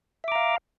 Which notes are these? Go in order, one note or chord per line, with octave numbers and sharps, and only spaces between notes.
E5 F5 A#5 D6